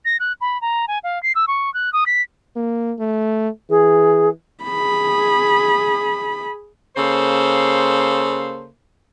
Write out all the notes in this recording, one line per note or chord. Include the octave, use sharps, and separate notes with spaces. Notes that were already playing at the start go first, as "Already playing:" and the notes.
A#6
F#6
B5
A#5
G#5
F5
C7
E6
C#6
F#6
D#6
B6
A#3
A3
E3 G#4
G#4 B5
C#3 A#3 A4 C5